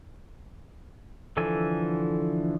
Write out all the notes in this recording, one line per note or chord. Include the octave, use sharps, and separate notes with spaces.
D3 E3 F3 A4 G#5